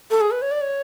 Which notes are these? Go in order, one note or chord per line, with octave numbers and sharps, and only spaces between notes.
A4
G#4
B4
C#5
D5
C#5